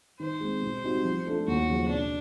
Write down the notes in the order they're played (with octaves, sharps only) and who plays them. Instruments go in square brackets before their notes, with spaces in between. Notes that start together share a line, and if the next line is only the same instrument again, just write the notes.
[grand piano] D#3 [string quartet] C5
[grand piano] G#3 C4
B2
G3 C4 D#4 F#4
F3
A3 D4 F4 A4
[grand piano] D#2 [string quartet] F#4
[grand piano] C#3 F3
[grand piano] B2 [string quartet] D4